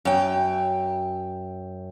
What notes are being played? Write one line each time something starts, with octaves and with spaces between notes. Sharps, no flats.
F#2 G5